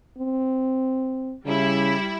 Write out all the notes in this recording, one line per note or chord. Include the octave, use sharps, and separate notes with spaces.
C4
C#3 G3 E4